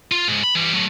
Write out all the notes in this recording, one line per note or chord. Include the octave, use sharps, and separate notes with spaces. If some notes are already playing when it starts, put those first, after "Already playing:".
F4
C#2 G#2
B5
E3 G3
F#3 A3